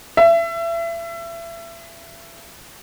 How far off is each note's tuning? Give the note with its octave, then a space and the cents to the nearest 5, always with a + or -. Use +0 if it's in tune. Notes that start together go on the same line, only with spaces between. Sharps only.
E5 +30